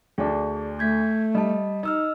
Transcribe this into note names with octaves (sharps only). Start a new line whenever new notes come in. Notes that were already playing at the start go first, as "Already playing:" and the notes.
D2 D4 G#4 D5 A5
A3 G6 G#6 B6
G3 D#5 A5
D#4 D#5 E6 F6